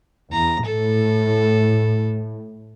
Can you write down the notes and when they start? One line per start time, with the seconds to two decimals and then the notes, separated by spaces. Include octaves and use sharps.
0.33 E2 A#5
0.65 A2 A4